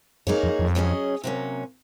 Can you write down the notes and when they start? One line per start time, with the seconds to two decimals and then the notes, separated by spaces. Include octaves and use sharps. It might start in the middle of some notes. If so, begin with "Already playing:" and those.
0.27 F#2 A#3 D#4 G#4 C#5
0.43 F2
0.59 F2
0.75 F#3 C#4 G#4 D#5
1.24 C3 F#3 A#3 C#4